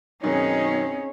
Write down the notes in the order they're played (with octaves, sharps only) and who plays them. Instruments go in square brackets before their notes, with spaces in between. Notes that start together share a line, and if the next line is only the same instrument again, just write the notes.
[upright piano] F#2 B2 D#3 [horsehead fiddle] C4 C#5 [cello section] C#4 D#4 G#4